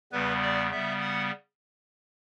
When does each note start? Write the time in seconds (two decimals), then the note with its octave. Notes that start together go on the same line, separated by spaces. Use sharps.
0.12 E2 C#3 G3 B3 B4
0.42 D5
0.72 C#3 G3 B3 E5
1.01 F#5